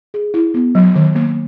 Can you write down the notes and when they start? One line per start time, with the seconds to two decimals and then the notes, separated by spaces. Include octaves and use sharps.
0.14 G#4
0.34 E4
0.54 B3
0.75 F#3
0.96 D#3
1.15 A#3